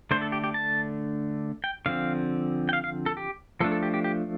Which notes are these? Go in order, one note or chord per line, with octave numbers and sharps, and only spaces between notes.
D3 A3 D4 C5
A4
G4
G4
A5
G5
D3 F3 C4 F5
G5
F5
F5
A4
G4
F3 A3 D4 A4
A4
G4
G4
G4